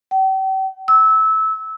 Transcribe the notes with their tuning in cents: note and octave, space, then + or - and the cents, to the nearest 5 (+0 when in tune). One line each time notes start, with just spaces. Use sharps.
G5 -40
E6 -20